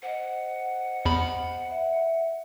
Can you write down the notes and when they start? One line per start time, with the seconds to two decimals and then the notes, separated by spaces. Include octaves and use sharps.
0.03 C5 D#5 F#5
1.05 E2 B5
1.71 E5